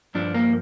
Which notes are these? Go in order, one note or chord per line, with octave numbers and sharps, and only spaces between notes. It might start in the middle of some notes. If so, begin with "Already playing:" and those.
G2 F3 D4
A#3